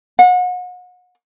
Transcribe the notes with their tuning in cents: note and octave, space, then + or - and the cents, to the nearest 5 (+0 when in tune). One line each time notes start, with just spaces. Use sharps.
F#5 -35